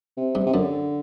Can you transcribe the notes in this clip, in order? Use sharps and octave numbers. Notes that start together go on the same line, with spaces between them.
C3
G2
C3
F#2 D3